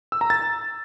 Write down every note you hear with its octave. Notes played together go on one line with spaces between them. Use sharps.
E6
A#5
A6